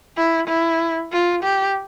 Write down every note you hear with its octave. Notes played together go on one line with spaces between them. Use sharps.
E4
E4
F4
G4